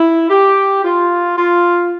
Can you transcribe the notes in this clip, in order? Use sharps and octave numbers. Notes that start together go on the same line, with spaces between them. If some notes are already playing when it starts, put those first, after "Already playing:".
Already playing: E4
G4
F4
F4